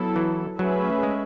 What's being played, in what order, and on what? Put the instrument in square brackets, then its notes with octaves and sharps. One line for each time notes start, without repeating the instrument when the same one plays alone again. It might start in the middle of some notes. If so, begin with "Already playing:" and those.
Already playing: [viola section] F#3 B3 E4 A4
[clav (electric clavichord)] E3
[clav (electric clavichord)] F#3 [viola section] A3 C#4 G#4 B4 E5
[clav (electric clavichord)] G#3